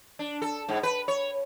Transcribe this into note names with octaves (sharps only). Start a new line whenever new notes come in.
D4
A4
G#2
B4
C#5